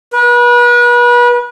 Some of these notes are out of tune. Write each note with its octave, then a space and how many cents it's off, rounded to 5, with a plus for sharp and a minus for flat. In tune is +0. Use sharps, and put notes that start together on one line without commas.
B4 -35